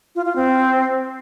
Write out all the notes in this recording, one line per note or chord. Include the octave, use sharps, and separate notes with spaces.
F4
F4
C4